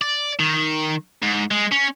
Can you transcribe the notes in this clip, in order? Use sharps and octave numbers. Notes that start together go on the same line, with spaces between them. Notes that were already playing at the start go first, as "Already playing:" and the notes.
D5
D#3
G#2
G#3
C#4